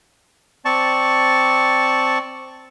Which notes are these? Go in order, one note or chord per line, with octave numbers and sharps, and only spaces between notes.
C4 D5 A5 C#6